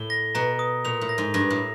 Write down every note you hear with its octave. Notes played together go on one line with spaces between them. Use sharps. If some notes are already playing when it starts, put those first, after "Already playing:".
Already playing: A2 G7
A#6
B2 A#5
D#6
A#2 F7
A2
A#6
G#2
G2 A#6
A2